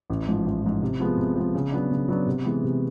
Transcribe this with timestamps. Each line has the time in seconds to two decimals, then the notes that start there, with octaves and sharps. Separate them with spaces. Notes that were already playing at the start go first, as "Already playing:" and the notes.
0.10 A1
0.27 G#2 F3
0.46 A1
0.63 G#2 F3
0.82 C3
1.00 F3 G#3 B3
1.17 C3
1.36 F3 G#3 B3
1.55 C#3
1.72 F#3 B3 D4
1.91 C#3
2.08 F#3 B3 D4
2.26 C3
2.45 E3 G#3 B3
2.63 C3